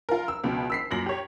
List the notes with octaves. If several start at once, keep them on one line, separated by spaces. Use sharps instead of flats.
F4 A#4
E6
C#2 B2
E6 B6 C7
F#2 A#2 A#6 F#7
G4 C#5